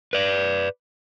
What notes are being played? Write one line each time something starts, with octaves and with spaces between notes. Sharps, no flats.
B4 D5